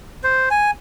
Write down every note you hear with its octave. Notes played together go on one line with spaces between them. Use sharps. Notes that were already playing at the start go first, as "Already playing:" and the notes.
C5
G#5